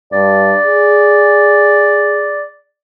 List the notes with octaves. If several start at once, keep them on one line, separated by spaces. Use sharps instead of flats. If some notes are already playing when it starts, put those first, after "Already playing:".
G2 D5
G#4